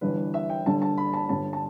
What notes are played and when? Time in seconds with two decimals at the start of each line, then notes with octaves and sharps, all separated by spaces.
0.01 G1 G2 E3 B4
0.34 E5
0.50 G5
0.66 G1 G2 D3 A5
0.82 A5
0.98 B5
1.13 A5
1.29 G1 G2 D3 A5
1.53 A5